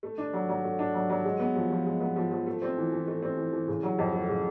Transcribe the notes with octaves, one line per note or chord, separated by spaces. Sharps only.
A3
D4
F#3
F#3
A3
D4
F#3
F#3
G#3
B3
F3
F3
G#3
B3
F3
F3
A3
C4
E3
E3
A3
C4
E3
E3
C#3
F#3
F2
A3
C#3